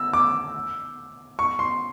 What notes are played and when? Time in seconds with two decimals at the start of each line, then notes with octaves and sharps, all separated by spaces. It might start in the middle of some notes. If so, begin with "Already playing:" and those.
Already playing: E6
0.13 D6
1.39 C#6
1.59 C6